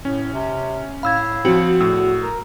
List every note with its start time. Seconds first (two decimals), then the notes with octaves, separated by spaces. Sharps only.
0.05 A2 C#4
0.34 C3
1.03 A2 F5 B5 E6 G#6
1.45 F3 C4 F#4
1.81 E2 A2 E6
2.22 A#4